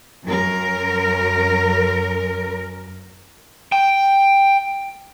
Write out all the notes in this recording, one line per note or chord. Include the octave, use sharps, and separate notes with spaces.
F#2 A#4
G5